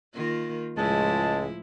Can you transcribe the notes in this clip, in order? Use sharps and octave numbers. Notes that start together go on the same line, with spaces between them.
D#3 A#3 F4
C#2 A2 F3 G#3 E4 A5